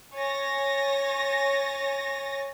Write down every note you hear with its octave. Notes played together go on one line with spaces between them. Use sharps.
C#5 G#5 A6 A#6